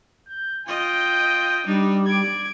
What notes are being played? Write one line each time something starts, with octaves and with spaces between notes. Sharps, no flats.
G6
F4 D#5 G5
G3 D4 D#4
D5 G#6 D7